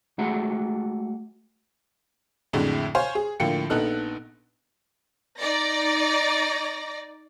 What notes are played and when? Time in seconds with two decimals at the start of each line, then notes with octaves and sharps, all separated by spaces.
0.18 G#3 A3 F#4 F#5 A#5
2.53 F2 A2 D3 F#3 G#3 A3
2.95 C5 C#5 F5 G#5 C6
3.15 G#4
3.40 A2 D3 F3 A#3 G5 C#7
3.70 A#1 B3 D#4 A4 F#6
5.39 D#4 D5 A#6